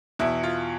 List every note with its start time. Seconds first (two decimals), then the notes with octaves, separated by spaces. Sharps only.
0.19 E2 B2 E4
0.43 F4